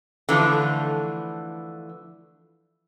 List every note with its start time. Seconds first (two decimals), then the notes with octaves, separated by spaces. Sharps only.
0.29 D3 E3 F3 A3